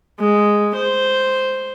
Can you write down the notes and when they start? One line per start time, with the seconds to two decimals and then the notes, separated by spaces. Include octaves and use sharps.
0.20 G#3
0.75 C5